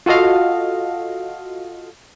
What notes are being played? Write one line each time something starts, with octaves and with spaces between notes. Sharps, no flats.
F4 F#4 A4 D#5 F5